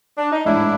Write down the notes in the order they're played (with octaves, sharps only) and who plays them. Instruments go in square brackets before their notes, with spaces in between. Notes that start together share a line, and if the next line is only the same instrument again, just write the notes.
[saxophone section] D4
D#4
[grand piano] A1 G#2 E3 [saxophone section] D4 E4